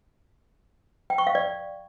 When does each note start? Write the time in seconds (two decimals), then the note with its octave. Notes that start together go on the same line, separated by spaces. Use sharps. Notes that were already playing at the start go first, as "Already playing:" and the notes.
1.10 G5
1.18 C#6
1.27 F5
1.35 D5